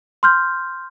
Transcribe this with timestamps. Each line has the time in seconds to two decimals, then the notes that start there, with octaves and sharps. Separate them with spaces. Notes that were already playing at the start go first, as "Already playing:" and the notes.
0.23 C6 F6 G6